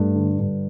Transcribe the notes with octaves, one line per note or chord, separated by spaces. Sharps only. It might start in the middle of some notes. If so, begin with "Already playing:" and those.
Already playing: G2 A3
D3
G2